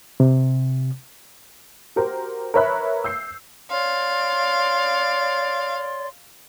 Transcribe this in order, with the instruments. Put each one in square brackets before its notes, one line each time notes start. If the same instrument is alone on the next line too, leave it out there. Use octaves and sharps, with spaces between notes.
[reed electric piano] C3
[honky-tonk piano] F#4 G4 A#4 C5
A#4 B4 C#5 E5 B5 F#6
E6 G6 C7
[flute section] C#5 D5 C6 [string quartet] F5